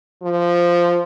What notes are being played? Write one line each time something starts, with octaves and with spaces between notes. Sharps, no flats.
F3